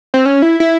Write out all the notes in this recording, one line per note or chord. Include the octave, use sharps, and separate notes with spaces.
C4
C#4
E4
E4